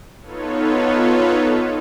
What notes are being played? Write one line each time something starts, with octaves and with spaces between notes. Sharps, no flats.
B3 D#4 F4 A4 B4 C#5